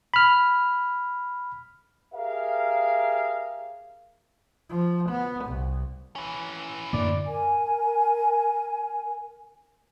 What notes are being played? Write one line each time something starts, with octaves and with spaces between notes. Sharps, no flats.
B5 F6
G4 G#4 A#4 E5 F5
F3
B3
C2
E3 C#4
F#2 A2 D3 A#3 D5
A#4 G#5